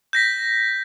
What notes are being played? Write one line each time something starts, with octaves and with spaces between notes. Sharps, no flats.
G6 A#6 B6